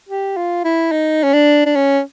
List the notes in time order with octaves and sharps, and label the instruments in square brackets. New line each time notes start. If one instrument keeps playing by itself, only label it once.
[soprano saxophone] G4
F4
E4
D#4
C#4
D4
D4
C#4